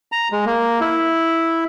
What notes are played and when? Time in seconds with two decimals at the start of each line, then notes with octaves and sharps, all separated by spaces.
0.12 A#5
0.32 G#3
0.46 A#3
0.81 E4